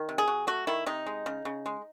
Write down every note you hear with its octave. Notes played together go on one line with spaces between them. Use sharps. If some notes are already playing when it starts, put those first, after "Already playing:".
Already playing: D#3
C3
G#4
F#3
A3 F#4
D#3 E4
C3 D#4
G#3
C#3
C#3
G#3